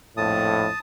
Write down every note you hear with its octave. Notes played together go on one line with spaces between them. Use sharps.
A#1 F2 A2 A5 D#6